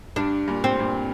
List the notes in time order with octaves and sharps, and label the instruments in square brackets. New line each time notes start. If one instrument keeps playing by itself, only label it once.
[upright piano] G2 [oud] D4
[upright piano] G2 A#2
[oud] C4
[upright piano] G2 A#2